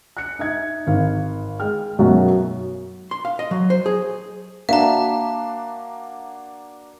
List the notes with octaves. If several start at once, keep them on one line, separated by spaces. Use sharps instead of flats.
F#6 C#7
D#4 E5 G#6
G#1 F5
G#3 G5 F6
B1 F#2 F#3 B3 F#4 E5
C6
F5
D#5
F#3
C5
G#4
A#3 D4 F#4 E5 F5 A5 A#5